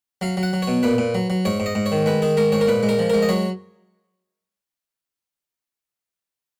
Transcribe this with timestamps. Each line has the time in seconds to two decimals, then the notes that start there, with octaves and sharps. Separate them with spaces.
0.21 F#3 F5
0.37 F#3
0.43 F#5
0.53 F#3
0.62 C#5
0.68 B2
0.83 A#2 B4
0.98 A#2
1.15 F#3
1.30 F#3
1.45 G#2 C#5
1.60 G#2
1.66 D#5
1.75 G#2
1.86 C#5
1.92 D#3
2.06 G#3 B4
2.22 D#3 G#4
2.37 G#3 A#4
2.52 G#2 C#5
2.61 A#4
2.67 A#2 B4
2.83 G#3
2.89 A#4
2.99 F3
3.10 G#3 A#4
3.23 D#5
3.29 F#3 C#5